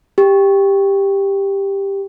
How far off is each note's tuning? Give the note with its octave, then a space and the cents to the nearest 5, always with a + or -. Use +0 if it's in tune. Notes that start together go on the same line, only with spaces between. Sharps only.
G4 +10